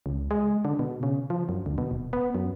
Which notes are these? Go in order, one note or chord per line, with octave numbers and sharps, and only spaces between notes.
C#2
G#3
D3
B2
C#3
F3
F#2
D2
B2
D#1
B3
F#2